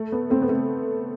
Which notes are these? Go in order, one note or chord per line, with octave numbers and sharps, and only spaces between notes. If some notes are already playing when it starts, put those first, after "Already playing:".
Already playing: A3
B3
A3 C4
B3
A3 C4